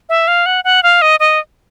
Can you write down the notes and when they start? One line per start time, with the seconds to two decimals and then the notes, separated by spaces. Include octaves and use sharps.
0.09 E5
0.28 F5
0.46 F#5
0.64 F#5
0.83 F5
1.02 D#5
1.20 D#5